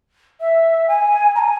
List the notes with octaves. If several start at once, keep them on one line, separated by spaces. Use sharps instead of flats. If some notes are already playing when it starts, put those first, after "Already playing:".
E5
G#5
A#5
G#5